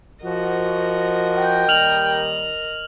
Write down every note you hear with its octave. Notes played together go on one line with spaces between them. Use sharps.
F3 F#4 A#4 D#5
G5
D#2 D#3 G3 F6 F7 F#7